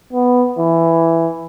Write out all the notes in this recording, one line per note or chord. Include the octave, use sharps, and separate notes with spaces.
B3
E3